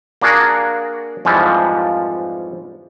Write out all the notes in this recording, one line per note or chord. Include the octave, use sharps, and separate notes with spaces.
A#3 D4 F#4 G#4 A#4
F2 G#2 E3 F3 G3